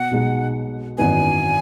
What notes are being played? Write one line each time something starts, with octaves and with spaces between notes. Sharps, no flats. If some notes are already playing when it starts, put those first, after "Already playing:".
Already playing: B2 F#5
B1 B2 G#3 D#4
G#1 F#2 E3 B3 D#4 G#5